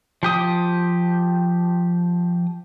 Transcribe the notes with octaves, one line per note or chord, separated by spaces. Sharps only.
F3 G4 D#6